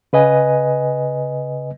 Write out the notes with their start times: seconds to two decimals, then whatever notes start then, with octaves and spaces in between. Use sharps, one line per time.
0.13 C#3 B4 D#5 G#5